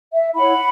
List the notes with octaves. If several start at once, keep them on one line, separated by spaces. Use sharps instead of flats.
E5
E4 C#5 F#5 B5